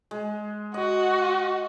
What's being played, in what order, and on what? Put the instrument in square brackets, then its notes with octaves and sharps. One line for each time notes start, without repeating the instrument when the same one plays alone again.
[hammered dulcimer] G#3
[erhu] F#4 [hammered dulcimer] D#5